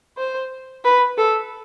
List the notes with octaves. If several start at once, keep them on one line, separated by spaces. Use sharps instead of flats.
C5
B4
A4